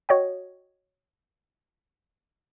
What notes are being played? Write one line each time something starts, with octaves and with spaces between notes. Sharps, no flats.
F#4 C#5 D#5 G5